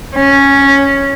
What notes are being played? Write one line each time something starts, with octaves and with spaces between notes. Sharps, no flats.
C#4